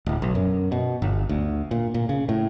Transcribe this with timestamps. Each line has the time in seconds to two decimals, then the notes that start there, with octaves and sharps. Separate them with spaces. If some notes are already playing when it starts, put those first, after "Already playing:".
0.06 D1
0.22 B1
0.35 F#2
0.72 B2
1.02 G1
1.29 D2
1.71 A#2
1.94 A#2
2.09 C#3
2.29 A2